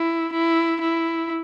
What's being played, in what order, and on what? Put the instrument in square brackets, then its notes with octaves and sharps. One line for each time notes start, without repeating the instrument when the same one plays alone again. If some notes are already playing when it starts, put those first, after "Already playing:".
Already playing: [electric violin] E4
E4
E4